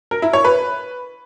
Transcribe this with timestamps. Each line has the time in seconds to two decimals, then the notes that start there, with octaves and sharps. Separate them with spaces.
0.11 A#4
0.22 E4
0.33 C#5
0.45 B4